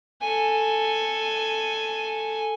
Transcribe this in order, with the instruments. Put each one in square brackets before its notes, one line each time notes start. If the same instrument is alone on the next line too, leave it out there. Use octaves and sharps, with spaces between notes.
[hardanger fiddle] A4 G#5